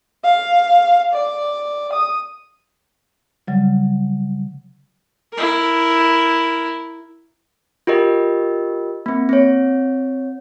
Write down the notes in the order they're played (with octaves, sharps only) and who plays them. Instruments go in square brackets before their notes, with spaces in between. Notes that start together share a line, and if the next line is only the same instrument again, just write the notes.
[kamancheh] F5
D5
D#6
[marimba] C#3 F#3 G3
[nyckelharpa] E4 A#4
[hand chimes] F4 G4 A#4 D#5
A#3 C4
C4 C#5